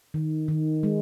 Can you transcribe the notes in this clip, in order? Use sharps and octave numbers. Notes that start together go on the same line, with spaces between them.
D#3
D#3
G#3